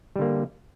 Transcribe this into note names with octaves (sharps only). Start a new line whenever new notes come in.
D3 G3 A#3